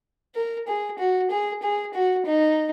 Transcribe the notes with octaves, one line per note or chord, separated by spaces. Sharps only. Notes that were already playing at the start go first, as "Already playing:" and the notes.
A#4
G#4
F#4
G#4
G#4
F#4
D#4